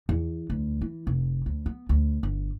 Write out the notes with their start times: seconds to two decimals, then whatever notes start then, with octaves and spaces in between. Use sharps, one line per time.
0.09 E2
0.50 D2
0.81 E3
1.07 F1
1.46 D2
1.66 B3
1.89 D2
2.23 G1